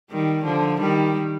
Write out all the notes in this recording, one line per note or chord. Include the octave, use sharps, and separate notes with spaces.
D#3 G3
D3 F3
D#3 G3